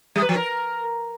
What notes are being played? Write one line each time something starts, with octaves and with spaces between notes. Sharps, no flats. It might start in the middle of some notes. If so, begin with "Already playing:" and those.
G3
B4
F3
A#4